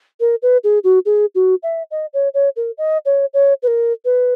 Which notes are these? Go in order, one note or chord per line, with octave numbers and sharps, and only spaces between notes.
A#4
B4
G#4
F#4
G#4
F#4
E5
D#5
C#5
C#5
A#4
D#5
C#5
C#5
B4
A#4
B4